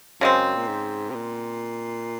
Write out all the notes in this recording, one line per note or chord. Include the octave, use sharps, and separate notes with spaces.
F#2 C#3 G#3 C4
A#2
G#2
C3
A#2